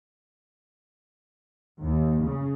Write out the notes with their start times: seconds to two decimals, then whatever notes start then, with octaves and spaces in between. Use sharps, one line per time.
1.82 D#2
2.24 C#3